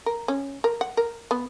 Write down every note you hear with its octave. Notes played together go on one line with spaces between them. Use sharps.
A#4
C#4
A#4
F#5
A#4
B3